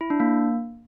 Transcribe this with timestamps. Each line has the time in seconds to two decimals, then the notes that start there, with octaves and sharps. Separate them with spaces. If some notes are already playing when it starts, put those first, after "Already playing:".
0.01 E4
0.10 D4
0.20 A#3